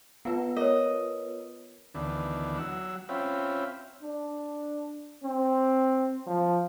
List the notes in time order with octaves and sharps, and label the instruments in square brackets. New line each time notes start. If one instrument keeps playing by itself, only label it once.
[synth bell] B3 F4 B4 [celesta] F#5
[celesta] A#4 C#5 [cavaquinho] D#5
[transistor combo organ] D2 D#3 E3 B3 D4
F#3 F#5 E6
C4 C#4 F4 E5 G5 B5
[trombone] D4
C4
F3